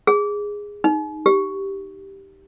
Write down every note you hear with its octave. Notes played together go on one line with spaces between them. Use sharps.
G#4
D#4
G4